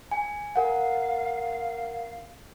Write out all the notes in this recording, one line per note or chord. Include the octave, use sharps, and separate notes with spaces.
G#5
A#4 F5 F#5